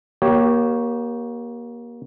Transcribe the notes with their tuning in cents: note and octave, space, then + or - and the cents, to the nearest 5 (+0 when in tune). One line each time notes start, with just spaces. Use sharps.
A#3 +25 G4 -15 C#5 +0